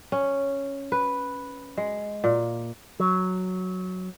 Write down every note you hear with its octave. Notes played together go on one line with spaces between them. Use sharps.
C#4
B4
G#3
A#2
F#3